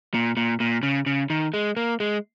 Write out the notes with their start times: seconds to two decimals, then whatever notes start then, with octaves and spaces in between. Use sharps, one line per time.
0.14 A#2
0.37 A#2
0.60 A#2
0.83 C#3
1.06 C#3
1.30 D#3
1.54 G#3
1.77 A#3
2.00 G#3